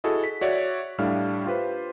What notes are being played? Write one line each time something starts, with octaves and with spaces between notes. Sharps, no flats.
E4 F#4 G#4 A4 D#5
B6
F#4 C#5 D5 E5
A2 G3 D4 F5 F6
F4 G4 B4 C5